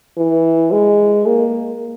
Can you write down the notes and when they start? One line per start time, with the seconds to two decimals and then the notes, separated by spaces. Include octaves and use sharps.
0.17 E3
0.72 G#3
1.26 A#3